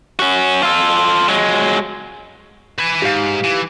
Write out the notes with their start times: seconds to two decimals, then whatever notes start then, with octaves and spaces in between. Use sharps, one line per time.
0.19 C#4 F#4
0.63 F4 A4
1.29 F#3 G#3
2.78 B4 G#5
3.02 G#2 G4 F5
3.44 E3